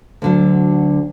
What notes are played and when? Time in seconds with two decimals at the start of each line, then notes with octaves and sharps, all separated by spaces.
0.22 D2 D3 F#3